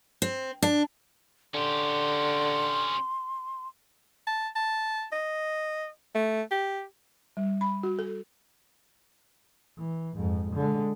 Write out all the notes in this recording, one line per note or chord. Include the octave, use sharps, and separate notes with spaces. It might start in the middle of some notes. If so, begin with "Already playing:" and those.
C4
D4
D3 C#4 G4 C6
A5
A5
D#5
A3
G4
G3
B5
F#4
A4
E3
F2 G#2
D3 G#3